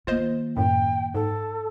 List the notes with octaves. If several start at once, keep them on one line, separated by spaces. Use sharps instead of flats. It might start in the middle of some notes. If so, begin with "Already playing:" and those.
D#3 A#3 F4 C5 D#5
F#2 A2 G5
G#2 A4